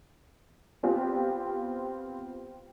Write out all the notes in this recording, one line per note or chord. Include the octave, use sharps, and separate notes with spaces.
B3 C4 F4 G4